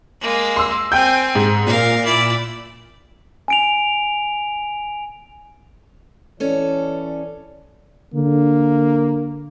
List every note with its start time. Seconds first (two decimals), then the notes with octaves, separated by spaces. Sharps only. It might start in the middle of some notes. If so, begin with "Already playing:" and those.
0.21 G#3 A#3
0.56 C6 E6
0.92 C4 G5 G#5 G6
1.35 G#2
1.67 A#2 A#4 F5
2.05 E4 D5
3.48 G#5 D7 F7
6.40 E3 C#4 A4 C#5 D5
8.14 D3 A#3